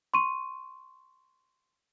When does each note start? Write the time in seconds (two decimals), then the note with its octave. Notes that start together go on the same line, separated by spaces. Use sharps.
0.14 C6 C#6 D#7